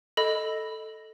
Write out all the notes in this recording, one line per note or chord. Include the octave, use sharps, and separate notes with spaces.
A4 D#5 B5